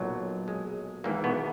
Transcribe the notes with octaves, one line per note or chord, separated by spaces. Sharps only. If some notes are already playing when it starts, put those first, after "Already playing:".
Already playing: B1 A#2 F#3
G#3
G#1 G#2 E3 A#3
B2 B3